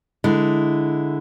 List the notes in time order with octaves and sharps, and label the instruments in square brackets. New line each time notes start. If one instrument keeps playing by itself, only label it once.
[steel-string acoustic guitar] D3 G#3 E4